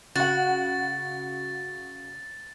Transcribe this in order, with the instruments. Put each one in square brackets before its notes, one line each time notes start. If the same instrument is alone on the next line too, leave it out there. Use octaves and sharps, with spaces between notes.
[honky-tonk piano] C#3 F#5 [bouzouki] F#4 [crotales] A6